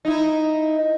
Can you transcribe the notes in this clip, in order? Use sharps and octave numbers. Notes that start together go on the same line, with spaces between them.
D#4 E4